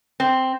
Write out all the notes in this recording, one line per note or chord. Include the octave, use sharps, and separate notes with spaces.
C4